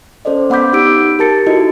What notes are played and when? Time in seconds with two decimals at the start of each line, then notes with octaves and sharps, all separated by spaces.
0.25 C#4 A4 C5 D5 D#5
0.50 B3 F#5 B5 D6 G6 B6
0.73 D#4 G4 E6 D7
1.19 G4 A#4 A5 A6 C#7
1.47 D#4 E4 F#4 A4 D#5